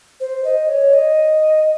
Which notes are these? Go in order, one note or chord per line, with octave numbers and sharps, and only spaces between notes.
C5
D#5
C#5
D#5